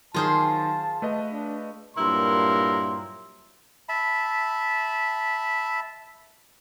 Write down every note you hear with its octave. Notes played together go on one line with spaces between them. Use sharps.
D#3 F#3 F4 G#4 C5 A5
A3 B4 D#5
D4
G2 A#2 F#3 E4 A#4 C6
E5 A5 B5